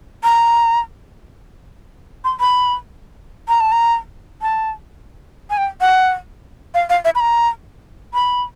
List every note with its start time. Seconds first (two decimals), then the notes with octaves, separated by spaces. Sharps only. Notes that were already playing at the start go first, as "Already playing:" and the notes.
0.24 A#5
2.24 C6
2.40 B5
3.49 A#5
3.61 A5
3.72 A#5
4.42 A5
5.50 G#5
5.58 G5
5.81 F#5
6.74 F5
6.90 F5
7.05 E5
7.15 B5
7.20 A#5
8.14 B5